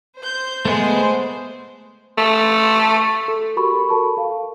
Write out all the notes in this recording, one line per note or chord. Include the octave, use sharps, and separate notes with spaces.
C5 G6
G#3 A3 B3 G#4 C5
A3
A4
F#4 G4 A#4 B5 C#6
A4 A#4 A5 C#6
A4 F5